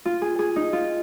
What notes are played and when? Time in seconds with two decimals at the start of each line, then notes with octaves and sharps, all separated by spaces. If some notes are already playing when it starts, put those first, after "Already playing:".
0.05 F4
0.22 G#4
0.39 G#4
0.56 D#4
0.73 F4